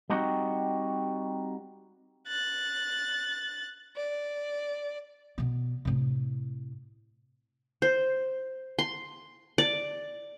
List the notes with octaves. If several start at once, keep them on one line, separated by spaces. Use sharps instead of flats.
G3 C4 D#4 F#4
F#6 A6
D5
B2 B3
A2 C3
C5
C6
D5